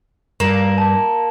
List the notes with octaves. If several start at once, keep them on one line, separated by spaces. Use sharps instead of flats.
G2 A#3 E7 F#7
A5